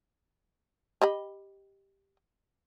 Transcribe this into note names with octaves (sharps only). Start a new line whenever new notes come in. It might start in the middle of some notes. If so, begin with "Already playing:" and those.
G4 D#5 B5